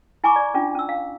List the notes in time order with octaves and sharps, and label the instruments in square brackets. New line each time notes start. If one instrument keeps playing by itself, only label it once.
[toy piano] E4 G#5 A#5 C#6 D6
D5
C#4 D4 F4
C#4 E6
F5